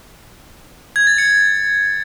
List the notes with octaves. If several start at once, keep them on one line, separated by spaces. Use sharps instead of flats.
G#6
A6
C#7